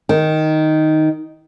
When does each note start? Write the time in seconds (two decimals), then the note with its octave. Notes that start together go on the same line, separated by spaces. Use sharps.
0.09 D#3